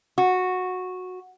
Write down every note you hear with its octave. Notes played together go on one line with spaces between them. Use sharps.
F#4